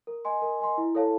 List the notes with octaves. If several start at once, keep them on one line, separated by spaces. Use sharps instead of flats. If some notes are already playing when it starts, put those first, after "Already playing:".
A#4
D#5 G#5 C6
A#4
D#5 G#5 C6
E4
A4 C#5 F5 A5